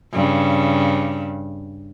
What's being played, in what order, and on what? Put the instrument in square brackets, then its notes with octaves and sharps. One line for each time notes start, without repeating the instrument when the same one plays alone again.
[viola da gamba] G2 C#3